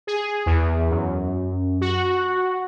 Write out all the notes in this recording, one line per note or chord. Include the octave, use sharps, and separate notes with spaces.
G#4
E2
F#2
F#4